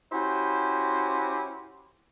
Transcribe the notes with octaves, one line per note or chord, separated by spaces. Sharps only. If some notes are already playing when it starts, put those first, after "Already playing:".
C#4 E4 F#4 G4 C5